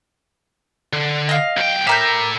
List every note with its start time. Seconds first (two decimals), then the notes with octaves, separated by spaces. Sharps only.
0.93 D3
1.29 D#5 F5
1.57 B1 G5
1.87 A2 G4 A#4 E5 G6